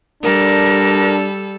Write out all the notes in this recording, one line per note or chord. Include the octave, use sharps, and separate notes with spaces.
G3 D4 A4 A#4